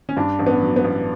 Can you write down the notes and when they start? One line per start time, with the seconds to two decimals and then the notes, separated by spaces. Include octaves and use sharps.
0.09 C#4
0.17 G2 D4
0.39 A1
0.47 B3
0.62 F#3
0.76 B3
0.84 A1